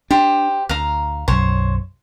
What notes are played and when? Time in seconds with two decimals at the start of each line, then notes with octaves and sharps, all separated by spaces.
0.11 D4 G4 C5
0.69 D2 F5 A#5
1.28 B1 F#2 C5 C#5